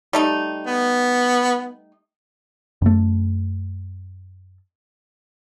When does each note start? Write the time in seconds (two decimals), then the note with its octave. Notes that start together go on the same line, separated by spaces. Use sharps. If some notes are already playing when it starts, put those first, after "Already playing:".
0.13 G3 A3 D#4
0.67 B3
2.82 F#2 A3